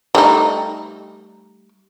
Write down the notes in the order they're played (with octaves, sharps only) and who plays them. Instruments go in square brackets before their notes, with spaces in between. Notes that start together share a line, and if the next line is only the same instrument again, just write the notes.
[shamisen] G3 A3 D#4